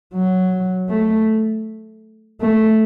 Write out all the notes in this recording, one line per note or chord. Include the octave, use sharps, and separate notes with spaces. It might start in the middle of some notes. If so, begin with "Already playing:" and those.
F#3
A3
A3